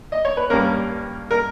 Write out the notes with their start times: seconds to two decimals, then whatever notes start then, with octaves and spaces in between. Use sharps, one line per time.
0.12 D#5
0.25 C#5
0.37 B4
0.50 G2 G3 A#3 C#4 A#4
1.31 A#4